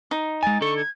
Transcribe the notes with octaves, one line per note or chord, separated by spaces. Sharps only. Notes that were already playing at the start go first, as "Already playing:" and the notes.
D#4
G#3 G#5 A6
D3 A4 C#6
G#6